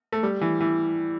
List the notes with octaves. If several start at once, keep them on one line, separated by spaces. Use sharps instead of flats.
A3
G3
E3
E3